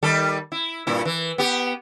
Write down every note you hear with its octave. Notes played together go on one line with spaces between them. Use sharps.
D#3 G3 A4
E4
G2 A#2 E4
E3
B3 G4